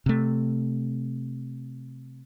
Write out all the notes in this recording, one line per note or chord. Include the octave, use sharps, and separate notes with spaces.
C3 A3